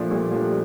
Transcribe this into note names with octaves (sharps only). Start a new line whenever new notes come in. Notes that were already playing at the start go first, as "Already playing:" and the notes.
Already playing: A#2 F3 A3 D4
A#2 G3
F3 A3 D4